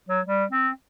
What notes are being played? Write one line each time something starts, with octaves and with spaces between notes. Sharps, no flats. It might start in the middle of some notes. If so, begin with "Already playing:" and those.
F#3
G3
C4